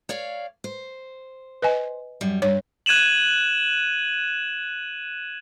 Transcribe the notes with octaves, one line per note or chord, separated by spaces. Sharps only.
C#5 D5 F5
C5
B4 D#5 G#5
F#2 G3
G2 C#5
F#6 G#6 D#7 E7 F#7